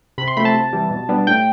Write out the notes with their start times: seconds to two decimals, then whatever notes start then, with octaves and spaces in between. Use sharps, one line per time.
0.18 C3 B5
0.28 C6
0.36 F3 A3 C4 B5
0.45 A5
0.54 C3
0.73 E3 G3
0.91 B2
1.09 G3 B3 D4
1.27 A2 G5